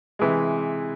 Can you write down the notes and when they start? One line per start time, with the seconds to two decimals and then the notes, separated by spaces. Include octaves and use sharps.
0.19 C3 E3 G#3